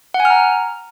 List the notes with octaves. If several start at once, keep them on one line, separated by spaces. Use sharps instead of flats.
F#5
G#5
F6
A#5